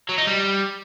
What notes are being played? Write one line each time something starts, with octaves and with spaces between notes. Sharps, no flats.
F#3
D#4
G3